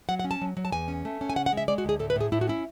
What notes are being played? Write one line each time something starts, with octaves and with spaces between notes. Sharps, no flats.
F#3 F#5
F#5
C#4
A5
F#3
F#3
A5
E2 G#5
C#4
A3
C#4
G#5
C#3 F#5
F#5
G#3
E5
G#3 D5
F#4
D2 G#4
A2 A4
B4
A2 G#4
A2 E4
F#4
C#4 E4